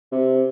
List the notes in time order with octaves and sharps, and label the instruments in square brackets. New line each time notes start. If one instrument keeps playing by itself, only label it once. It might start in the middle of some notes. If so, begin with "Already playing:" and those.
[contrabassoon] C3